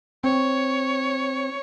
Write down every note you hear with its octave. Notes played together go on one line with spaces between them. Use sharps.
C4 C#5